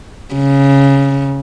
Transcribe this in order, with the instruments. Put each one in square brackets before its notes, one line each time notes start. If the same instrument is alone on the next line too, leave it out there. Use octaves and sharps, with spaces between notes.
[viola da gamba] C#3